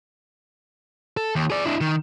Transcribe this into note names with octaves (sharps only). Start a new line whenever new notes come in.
A4
D#2
G#4 D5
D4 E4
D#3